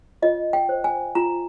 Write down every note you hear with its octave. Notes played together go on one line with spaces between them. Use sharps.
F4 D#5
G5
C5
G#5
F4 A#5